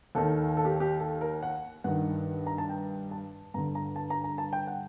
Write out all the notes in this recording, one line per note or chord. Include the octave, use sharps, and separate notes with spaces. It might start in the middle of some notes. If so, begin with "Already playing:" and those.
D#2 D#3 A4
A4
G4
G4
A4
A#4
F#5
G2 D#3 F#5
A#5
A5
G5
A5
G2 D3 A#5
A#5
A5
A#5
A#5
A5
G5
F#5